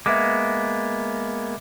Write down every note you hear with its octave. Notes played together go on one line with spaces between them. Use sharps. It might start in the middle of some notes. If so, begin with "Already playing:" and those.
G#3 A#3 B3 E5 D6